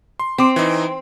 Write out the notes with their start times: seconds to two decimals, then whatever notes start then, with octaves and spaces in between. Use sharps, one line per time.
0.20 C6
0.38 C4 C6 D6
0.56 E3 D#4